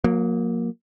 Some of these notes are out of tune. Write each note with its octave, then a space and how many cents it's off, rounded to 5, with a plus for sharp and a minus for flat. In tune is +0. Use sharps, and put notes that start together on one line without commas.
F#3 -40 A#3 +0